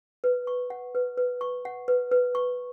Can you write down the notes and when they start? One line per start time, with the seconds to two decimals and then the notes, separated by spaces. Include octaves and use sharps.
0.24 B4
0.47 C#6
0.70 F#5
0.95 B4
1.18 B4
1.41 C#6
1.65 F#5
1.88 B4
2.12 B4
2.35 C#6